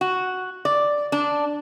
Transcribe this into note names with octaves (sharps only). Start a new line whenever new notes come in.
F#4
D5
D4